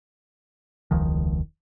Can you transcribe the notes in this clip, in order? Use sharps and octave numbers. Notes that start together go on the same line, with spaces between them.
E1 C#2 D#3 F3